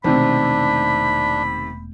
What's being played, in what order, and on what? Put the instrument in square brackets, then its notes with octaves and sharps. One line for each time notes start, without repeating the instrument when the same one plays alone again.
[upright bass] E1 A3 [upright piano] C3 D#3 C4 [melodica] D4 [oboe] B5